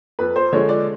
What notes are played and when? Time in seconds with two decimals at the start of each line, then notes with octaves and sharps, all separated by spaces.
0.19 F2 B4
0.36 C5
0.53 D3 F3 G#3 C#5
0.69 D5